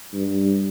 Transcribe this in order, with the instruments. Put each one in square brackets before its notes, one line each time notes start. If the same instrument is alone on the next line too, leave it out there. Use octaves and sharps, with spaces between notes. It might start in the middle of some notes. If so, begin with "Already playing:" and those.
[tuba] G2